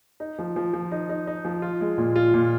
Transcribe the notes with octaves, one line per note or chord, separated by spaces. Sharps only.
D#4
F3
F3
F3
D#4
D#4
D#4
F3
F4
G#3
A#2
F4
A#2